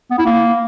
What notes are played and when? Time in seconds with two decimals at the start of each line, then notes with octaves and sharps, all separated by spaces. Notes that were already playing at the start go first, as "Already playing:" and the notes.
0.11 B3
0.18 E4
0.26 A#3